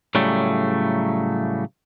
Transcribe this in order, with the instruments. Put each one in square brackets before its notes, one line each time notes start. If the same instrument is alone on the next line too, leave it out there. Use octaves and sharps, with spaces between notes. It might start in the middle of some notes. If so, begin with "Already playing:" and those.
[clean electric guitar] A2 C#3 F#3 G3 A3